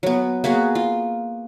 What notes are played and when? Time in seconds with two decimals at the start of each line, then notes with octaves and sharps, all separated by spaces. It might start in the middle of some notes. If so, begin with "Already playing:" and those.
0.03 F#3 B3
0.44 A#3 B3 F#4 G#4
0.75 F4